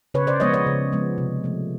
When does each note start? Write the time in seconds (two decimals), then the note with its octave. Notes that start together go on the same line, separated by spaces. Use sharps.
0.14 C#3 B4 C#5
0.27 C5 D5
0.40 F3 G#3 B3 C#5 D#5
0.54 C#5 D#5
0.67 C#3
0.92 F3 G#3 B3
1.18 C3
1.44 F3 A3